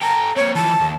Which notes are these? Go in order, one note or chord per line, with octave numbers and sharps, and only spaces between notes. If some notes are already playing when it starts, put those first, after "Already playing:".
G4 A4 A#5
A#3 C4 C#5
E3 F3 A5
D#2